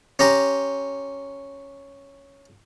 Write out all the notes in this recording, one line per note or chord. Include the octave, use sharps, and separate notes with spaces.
C#4 G4 A#5 C6